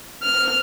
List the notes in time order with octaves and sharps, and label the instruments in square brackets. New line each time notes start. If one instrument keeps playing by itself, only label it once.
[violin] F6